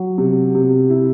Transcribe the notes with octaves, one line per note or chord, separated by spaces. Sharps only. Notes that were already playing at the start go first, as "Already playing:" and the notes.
Already playing: F#3
C3
C3
E4